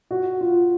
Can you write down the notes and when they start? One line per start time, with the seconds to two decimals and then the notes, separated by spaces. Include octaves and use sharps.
0.11 F#4
0.41 F4